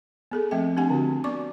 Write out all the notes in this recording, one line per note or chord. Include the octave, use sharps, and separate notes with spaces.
B3 G#4 A4
F3 A3 C4 E5 G5
C4 D4 G4 F#5 G#5
D3 C4 F#4
B3 D5 C#6 D6